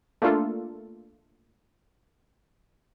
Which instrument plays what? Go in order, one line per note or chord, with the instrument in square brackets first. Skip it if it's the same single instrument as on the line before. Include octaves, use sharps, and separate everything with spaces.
[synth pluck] A3 A#3 D4 F4 A4